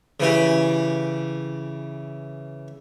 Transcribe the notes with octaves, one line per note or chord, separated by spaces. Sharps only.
C#3 E3 G4